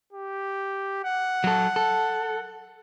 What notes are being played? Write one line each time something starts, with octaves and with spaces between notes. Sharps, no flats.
G4
F#5
F#3 A4
A4